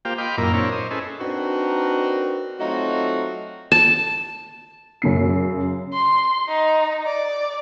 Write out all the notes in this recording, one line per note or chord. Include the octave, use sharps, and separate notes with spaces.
A#3 F4 G4 C5 F5 G5
D#5 F5 G5 B5 C6 D6
F#2 A#2 A#3 E4 A#4
C4 D4 E4 A#4 C#5
C5 D#5
C#4 E4 G#4 A4 B4 C5
C4 D4 D#4 F#4 A#4 B4
F#3 A3 C4 D#4 F4 F#4
A5
F#2 C#3 C7
C6
D#4
D5